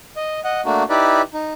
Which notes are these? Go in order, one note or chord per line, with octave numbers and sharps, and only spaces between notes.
D#5
D#5 F#5
A3 A#3 D4 F#4
D#4 E4 G4 B4 D5
D#4